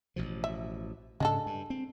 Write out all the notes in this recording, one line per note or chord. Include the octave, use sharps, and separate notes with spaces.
A1 B2 F3
E5
G#2 C#3 G#3 D4 A4
G2
C4